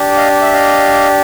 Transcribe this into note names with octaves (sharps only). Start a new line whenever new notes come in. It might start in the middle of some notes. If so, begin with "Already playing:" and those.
Already playing: D4 G4
D#5 F5
E5
D#5 F5